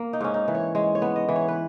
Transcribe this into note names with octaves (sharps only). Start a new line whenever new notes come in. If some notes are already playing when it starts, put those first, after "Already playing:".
Already playing: A#3
D#4
G#2 C#4
D#4
E3
C#5
G#3 C#5
C#5
B3
D#5
E3
C#5
B4